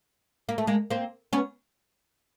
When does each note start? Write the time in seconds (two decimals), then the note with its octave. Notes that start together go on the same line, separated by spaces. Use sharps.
0.49 A#3
0.58 A3
0.67 G#3 A#3
0.90 A#3 C4
1.33 B3 C#4